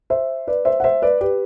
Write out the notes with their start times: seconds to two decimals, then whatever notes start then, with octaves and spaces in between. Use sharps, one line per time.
0.10 C5 E5
0.48 B4 D5
0.65 C5 E5
0.80 F#5
0.84 C5 E5
1.02 B4 D5
1.21 G4 B4